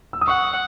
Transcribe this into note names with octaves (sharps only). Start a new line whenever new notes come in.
E6
D#6
F#5 C#6